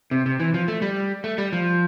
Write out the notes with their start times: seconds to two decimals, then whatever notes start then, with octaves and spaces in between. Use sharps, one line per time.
0.11 C3
0.26 C3
0.40 E3
0.54 F3
0.68 A3
0.82 G3
1.24 A3
1.38 G3
1.53 F3